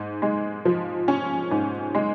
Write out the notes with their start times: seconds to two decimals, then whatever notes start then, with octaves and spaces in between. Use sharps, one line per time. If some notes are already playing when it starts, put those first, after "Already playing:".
Already playing: G#2
0.22 G#3
0.65 F3
1.08 C#4
1.51 G#2
1.95 G#3